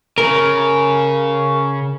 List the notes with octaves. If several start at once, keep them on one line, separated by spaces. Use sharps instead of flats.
C#3 A#4